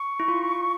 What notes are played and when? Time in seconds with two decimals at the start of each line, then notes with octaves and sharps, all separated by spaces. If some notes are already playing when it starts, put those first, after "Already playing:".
Already playing: C#6
0.20 E4
0.28 F4